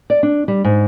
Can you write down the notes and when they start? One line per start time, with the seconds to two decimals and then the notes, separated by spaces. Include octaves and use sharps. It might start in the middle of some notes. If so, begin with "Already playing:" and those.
0.10 D5
0.23 D4
0.48 G3
0.64 G#2